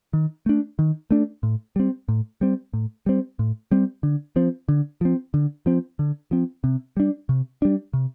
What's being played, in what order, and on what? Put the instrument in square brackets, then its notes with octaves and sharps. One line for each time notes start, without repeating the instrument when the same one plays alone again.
[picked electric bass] D#3
A3 D4
D#3
A3 D4
A2
G3 C4
A2
G3 C4
A2
G3 C4
A2
G3 C4
D3
F3 C4
D3
F3 C4
D3
F3 C4
D3
F3 C4
C3
G3 D4
C3
G3 D4
C3